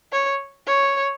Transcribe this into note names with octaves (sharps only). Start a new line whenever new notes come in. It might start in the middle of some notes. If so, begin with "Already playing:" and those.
C#5
C#5